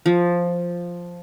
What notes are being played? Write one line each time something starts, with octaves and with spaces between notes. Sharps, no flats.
F3